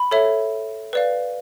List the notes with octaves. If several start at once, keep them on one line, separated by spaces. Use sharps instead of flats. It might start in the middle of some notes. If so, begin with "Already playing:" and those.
Already playing: B5
A4 C#5 E5
B4 D5 F5